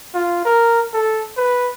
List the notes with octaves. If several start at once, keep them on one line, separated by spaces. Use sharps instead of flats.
F4
A#4
A4
B4